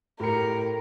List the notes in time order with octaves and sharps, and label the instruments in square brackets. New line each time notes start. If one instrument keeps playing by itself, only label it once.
[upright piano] A2 G4 C#7 [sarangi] A#4